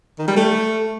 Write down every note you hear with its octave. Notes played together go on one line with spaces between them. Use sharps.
D#3
G3
A3